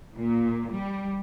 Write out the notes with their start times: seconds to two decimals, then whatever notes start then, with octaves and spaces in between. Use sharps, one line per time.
0.16 A#2
0.73 G3